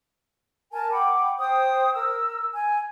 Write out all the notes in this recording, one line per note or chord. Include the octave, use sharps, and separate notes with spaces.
A#4 G#5 A5
F#5 G5 B5 D6
C5 G5 D#6
A#4 E6
G#5